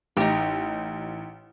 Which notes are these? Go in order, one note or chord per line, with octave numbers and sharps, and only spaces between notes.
A1 D#4 G4